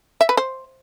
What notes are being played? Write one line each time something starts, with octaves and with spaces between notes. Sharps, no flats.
E5
B4
C5